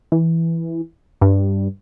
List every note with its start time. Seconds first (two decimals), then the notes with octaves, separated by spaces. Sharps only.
0.12 E3
1.21 G2